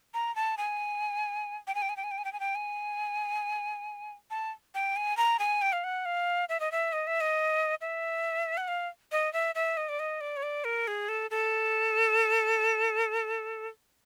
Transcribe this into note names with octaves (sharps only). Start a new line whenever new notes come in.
A#5
A5
G#5
G5
G#5
G5
G#5
G5
G#5
G5
G#5
G5
G#5
G5
G#5
A5
G5
G#5
A#5
G#5
G5
F5
F#5
F5
E5
D#5
E5
D#5
E5
D#5
E5
F#5
F5
D#5
E5
E5
D#5
D5
D#5
D5
C#5
D5
A#4
G#4
A4
A4